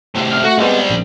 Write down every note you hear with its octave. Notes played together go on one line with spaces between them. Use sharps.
A2 C3
F6
A3 F#4 A#6 C#7
C2 G3 G#3 B3
A#1